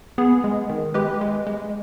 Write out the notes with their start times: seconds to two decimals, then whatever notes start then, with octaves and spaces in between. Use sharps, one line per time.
0.18 B3 G#4
0.44 G#3
0.69 D#3
0.94 G#3 G4 B4
1.21 G#3
1.47 G#3